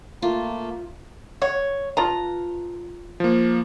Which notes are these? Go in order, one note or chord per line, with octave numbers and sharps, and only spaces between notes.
A3 A#3 F4
C#5 F#5
F4 B4 A5 A#5
F3 A#3